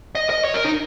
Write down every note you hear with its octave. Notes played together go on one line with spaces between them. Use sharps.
D#5
D#5
C#5
A#4
D#4